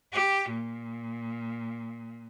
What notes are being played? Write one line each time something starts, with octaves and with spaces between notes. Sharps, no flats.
G4
A#2